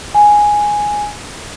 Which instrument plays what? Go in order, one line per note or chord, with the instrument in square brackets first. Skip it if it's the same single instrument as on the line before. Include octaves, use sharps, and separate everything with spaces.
[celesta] G#5